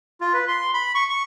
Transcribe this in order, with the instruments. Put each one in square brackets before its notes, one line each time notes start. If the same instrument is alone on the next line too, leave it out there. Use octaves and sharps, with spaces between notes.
[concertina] F4
B4
C6
B5
C#6
C#6